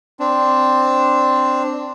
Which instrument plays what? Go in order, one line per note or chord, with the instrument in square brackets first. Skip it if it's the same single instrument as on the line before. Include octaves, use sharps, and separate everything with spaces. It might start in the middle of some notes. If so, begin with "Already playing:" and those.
[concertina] C4 D4